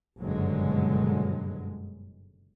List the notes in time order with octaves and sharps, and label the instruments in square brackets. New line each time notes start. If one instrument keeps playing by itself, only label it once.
[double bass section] F#1 G2 B2 D3 F#3 G#3